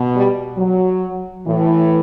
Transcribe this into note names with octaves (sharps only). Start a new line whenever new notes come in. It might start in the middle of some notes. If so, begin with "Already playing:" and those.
Already playing: B2
G3
F#3
A2 E3